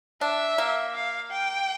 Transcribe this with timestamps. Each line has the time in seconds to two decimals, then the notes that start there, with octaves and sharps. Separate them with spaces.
0.21 D4 E5
0.58 A#3
0.95 F5
1.31 G5